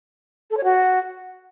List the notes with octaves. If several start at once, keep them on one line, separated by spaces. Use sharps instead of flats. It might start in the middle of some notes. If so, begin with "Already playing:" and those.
A4
C#5
F#4